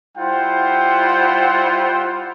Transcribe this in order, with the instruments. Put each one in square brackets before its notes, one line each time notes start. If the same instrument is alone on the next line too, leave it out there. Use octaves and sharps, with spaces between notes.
[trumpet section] G3 E4 F4 C5 F#5 G5